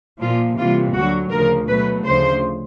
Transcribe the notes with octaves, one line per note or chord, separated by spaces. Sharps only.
A#2 F3 A#3 F4
C3 E3 G3 A#3 F4
D2 D3 F#3 F#4
D2 C#3 F3 A#4
B2 F#3 A3 B4
D2 C#3 F3 C5